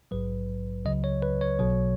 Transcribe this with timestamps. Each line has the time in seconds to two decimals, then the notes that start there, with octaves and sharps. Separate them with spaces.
0.11 A#1 G#2 F#3 B4
0.85 C#2 C#3 F#3 D#5
1.04 C#5
1.22 B4
1.41 C#5
1.59 B1 B2 F#3